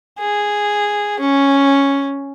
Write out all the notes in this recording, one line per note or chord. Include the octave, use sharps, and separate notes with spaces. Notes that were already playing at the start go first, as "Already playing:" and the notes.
G#4
C#4